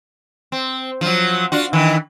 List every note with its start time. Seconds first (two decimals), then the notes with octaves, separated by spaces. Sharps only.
0.52 C4
1.01 F3 F#3
1.52 D4 F4 F#4
1.73 D#3 E3